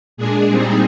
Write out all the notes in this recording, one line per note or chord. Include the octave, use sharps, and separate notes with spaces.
A#2 G#3 D4 G#4
A#2 G3 C4 D#4 G#4